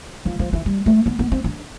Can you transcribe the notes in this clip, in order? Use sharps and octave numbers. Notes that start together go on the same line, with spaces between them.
F3
F3
E3
G3
A3
B3
B3
C4
D4